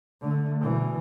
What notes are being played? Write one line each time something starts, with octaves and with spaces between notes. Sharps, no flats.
D3 A3
B2 E3